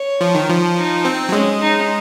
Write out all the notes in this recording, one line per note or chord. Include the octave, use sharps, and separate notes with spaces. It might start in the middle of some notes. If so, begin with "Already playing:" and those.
Already playing: C#5
F3
D#3
F3
D#4
C4
F#3
G#3 C#4
D#4